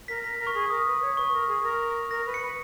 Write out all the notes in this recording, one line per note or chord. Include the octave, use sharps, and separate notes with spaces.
A#4 B6
A#4 B6
A#4
C#6
G#4
A#4 D#6
B4
C#5
B4 C#6
A#4
G#4
A#4
A#4 A#6
B4
C#7
B4